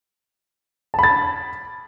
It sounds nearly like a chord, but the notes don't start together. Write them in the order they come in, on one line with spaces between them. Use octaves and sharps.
A5 B5 A6